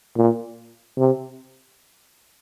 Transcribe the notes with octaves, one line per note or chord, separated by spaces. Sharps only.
A#2
C3